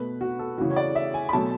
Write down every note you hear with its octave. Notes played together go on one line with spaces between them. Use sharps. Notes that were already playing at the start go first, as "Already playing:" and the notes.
Already playing: B2 A3 B4
F#4
A4
C#3 E3 A3 F#4
C#5
D5
E5
G#5
B5
B2 F#3 A3 A5